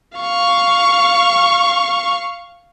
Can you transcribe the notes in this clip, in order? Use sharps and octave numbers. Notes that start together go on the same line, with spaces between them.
F5 C#6